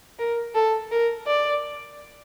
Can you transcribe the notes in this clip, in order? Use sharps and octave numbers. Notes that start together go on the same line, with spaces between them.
A#4
A4
A#4
D5